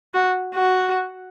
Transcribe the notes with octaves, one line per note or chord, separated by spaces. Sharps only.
F#4
F#4